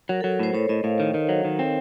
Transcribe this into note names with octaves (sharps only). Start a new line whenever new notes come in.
F#3 A#4
A4
F#3
A4
A2 C5
A2 C#5
A2 D#5
A2 F5
D#3
D#3
F#3
D#3
C4